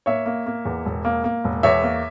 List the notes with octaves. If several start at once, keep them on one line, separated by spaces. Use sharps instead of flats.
A#3 C#5 E5
A#3
A#3
E2
E1
A#3
A#3
E1
E2 C#5 E5
A#3